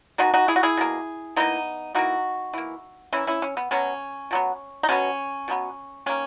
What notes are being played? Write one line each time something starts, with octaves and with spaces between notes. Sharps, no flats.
B2 A#3 D#4 F#4
D#4 F#4
E4 G#4
F#4
E4 G#4
B2 A#3
E3 A#3 B3 D#4
E3 A#3 D#4 F#4
E3 A#3
E3 A#3 C#4 E4
C#4 E4
C#4
B3
B2 F#3 B3 C#4
B2 F#3 B3
D#4
B2 F#3 B3 C#4
B2 F#3 B3
D#3 A#3 C#4